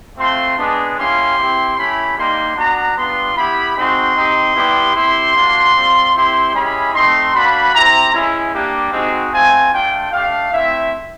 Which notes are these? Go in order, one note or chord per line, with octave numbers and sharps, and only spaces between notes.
A3 C4 F4 C6
G#3 B3 D4
A#3 C#4 E4 G4 C6
C4 E4 G4
A3 C#4 E4 G4 B5
G3 A#3 D#4 C6
B3 D4 F#4 A#5
G3 B3 D4 F4 C6
B3 E4 G4 B5
G#3 C4 D#4 F#4 C6
C4 D#4 G4
G3 B3 E4 G4
C4 E4 G4 C6
A#3 D4 F#4
G3 C4 F4
C4 E4 G4 C6
G#3 C#4 E4 G4 B5
A3 C4 D#4 C6
A#3 D4 F#4 B5
C4 E4 G4 A#5
G#3 C#4 E4
G3 A#3 D4 G4
G#3 C4 D#4 F#4
A3 C4 F4 G#5
A3 D4 F4 G5
A3 D4 G4 F5
A3 C4 E4 E5